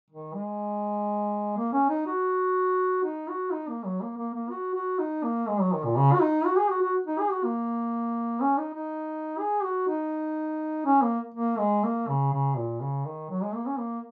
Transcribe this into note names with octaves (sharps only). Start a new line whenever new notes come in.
D#3
G#3
A#3
C#4
D#4
F#4
D#4
F#4
D#4
A#3
F#3
A#3
A#3
A#3
F#4
F#4
D#4
A#3
G#3
F#3
D#3
A#2
C#3
F#4
D#4
F#4
G#4
F#4
F#4
D#4
G#4
F#4
A#3
C#4
D#4
D#4
G#4
F#4
D#4
C#4
A#3
A#3
G#3
A#3
C#3
C#3
A#2
C#3
D#3
F#3
G#3
A#3
C#4
A#3